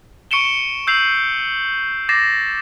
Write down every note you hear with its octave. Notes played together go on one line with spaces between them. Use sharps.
C#6 C#7 D7 E7 G7
E6 G6 C7 F7 F#7
D6 A6 A#6 C7 E7